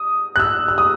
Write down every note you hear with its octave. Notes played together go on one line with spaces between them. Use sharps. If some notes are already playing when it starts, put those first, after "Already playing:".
Already playing: D#6
F#6
E6
E6
D#6